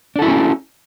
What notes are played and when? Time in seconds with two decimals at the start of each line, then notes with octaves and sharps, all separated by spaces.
0.16 D4
0.19 A4
0.22 E4
0.25 F#4
0.28 C#4